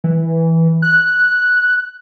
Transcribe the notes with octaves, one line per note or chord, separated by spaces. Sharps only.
E3
F#6